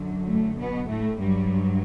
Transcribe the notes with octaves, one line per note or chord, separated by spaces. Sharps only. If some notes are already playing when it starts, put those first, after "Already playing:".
Already playing: F#2 D3 F#3
A2 A3
B2 B3
A2 A3
G2 F#3 G3